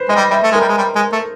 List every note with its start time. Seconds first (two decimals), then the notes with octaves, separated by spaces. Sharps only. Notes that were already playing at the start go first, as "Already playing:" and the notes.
Already playing: B4 C5
0.09 G#3 D#5
0.16 G3
0.31 G3 E5
0.43 A3
0.52 G#3
0.55 A#4
0.60 G3
0.68 G#3
0.78 G3
0.96 G#3
1.13 A3